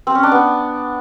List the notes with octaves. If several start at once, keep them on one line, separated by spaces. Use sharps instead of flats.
C4
C#4
D4
B3